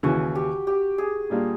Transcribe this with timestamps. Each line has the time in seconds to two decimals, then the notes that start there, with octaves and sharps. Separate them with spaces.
0.03 D#2 C#3 E3 F#4
0.35 G4
0.67 G4
0.98 G#4
1.30 A#2 G3 A#3 D4 F4